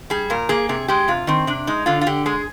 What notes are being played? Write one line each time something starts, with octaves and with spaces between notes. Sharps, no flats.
G3 G#4
A#2 A#4
A#3 G#4
C3 G#4
G#3 G4
C3 F4
D#3 C4
C3 D4
G#3 D#4
D3 F4
F4
D3 G4
G#3 G#4